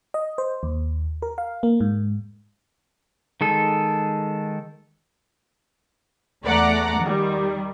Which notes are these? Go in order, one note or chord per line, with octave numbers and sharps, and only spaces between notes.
D#5
C5
D#2
A#4
F5
A#3
G#2
D#3 G#3 A4
E2 A3 D5 F#5 A#5
D#3 G3